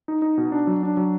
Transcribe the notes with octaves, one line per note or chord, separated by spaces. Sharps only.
D#4
D#4
B2
D4
F#3
D4
F#3